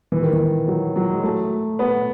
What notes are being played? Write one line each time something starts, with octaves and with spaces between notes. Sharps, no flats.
E3
D#3
E3
F#3
F#3
G#3
A3
B3